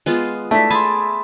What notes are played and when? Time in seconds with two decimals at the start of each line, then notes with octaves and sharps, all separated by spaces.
0.06 G#3 B3 F4
0.51 A3 D4 E4 A5 B6
0.70 G#4 E5 A5 B5 C6